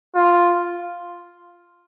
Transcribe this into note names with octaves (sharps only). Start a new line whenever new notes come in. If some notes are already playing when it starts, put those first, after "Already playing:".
F4